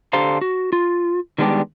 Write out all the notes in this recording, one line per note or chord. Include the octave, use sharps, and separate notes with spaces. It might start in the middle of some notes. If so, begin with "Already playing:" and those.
D3 G4 A4 C5 F5 A#5
F#4
F4
D#3 G3 G#3 B3 D4 G4